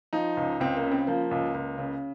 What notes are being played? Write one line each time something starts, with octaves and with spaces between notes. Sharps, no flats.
F3 D#4
C#2
C#2 C4
A#3
C#3
C4
F3 A#3
C#2
C#2
C#3